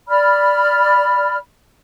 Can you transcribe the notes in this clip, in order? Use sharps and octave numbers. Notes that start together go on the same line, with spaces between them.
D5 B5 F6